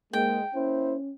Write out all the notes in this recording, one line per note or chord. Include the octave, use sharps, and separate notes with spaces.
G#2 G#3 A#3 G5
A#3 C#4 E4 C5